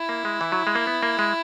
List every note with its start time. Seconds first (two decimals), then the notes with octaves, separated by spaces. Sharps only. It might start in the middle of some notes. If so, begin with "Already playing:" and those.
Already playing: E4
0.09 A#3
0.25 G#3
0.41 E3
0.52 F#3
0.67 G#3
0.75 A#3
0.87 B3
1.03 A#3
1.19 G#3